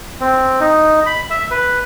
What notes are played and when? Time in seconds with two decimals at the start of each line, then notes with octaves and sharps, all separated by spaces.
0.20 C4
0.60 D#4
1.06 B5
1.31 E5
1.51 B4